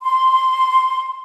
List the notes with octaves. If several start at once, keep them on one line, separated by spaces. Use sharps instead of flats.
C6